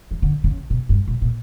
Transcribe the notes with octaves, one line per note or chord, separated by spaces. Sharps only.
E3
D3
D3
C#3
B2
G2
A#2
A#2